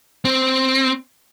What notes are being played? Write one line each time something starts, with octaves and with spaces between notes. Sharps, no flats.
C4